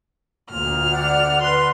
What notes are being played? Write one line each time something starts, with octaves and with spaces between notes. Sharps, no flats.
D2 A#2 F6
D5 F#5
B4 C6